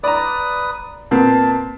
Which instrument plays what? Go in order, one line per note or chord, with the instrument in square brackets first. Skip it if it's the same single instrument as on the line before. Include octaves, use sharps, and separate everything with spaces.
[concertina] B4 D#6 [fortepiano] D5 A#5
[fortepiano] A#2 B3 C4 [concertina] A5